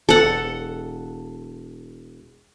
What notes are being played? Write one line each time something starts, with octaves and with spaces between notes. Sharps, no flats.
E1 A4 F#5